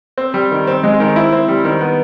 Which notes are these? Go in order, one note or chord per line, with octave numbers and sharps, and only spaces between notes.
C4
G3
D#3
C4
G#3
D#3
E4
C4
G3
D#3
B3